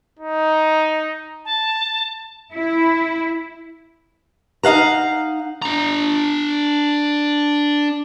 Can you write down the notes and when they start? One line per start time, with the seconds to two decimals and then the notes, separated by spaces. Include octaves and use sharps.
0.19 D#4
1.45 A5
2.53 E4
4.63 D#4 F5 F#5 A#5
5.62 D4 A#5